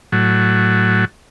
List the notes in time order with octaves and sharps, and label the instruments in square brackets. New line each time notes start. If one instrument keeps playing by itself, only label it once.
[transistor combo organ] A2 F#3